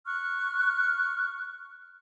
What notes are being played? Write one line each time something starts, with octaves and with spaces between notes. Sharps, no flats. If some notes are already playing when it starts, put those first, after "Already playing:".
C#6 F6 F#6